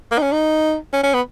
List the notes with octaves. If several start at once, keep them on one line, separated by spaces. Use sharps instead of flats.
A#3
D#4
C#4
D#4
C#4
C#4
B3